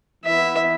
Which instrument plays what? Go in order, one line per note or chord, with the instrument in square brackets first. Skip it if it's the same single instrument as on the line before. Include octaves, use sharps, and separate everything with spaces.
[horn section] E3 B3 E4 [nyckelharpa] E5